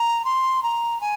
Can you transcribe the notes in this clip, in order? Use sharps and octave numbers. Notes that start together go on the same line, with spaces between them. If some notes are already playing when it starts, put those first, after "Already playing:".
Already playing: A#5
C6
A#5
G#5